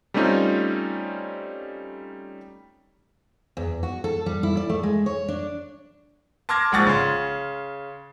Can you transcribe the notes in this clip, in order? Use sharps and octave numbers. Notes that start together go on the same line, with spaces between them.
G3 A3 C4 C#4 D#4 F4
E2
F#4
A4
G3
E4
D5
A3
G#3
C#5
D4
A5 C6 D6 F6 G#6 A#6
A#1 G#2 G#4 F#5 C#6 A6
C#3 C6